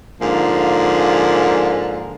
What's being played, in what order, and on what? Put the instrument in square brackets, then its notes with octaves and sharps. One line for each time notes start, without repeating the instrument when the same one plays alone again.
[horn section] G#2 D3 F3 A#3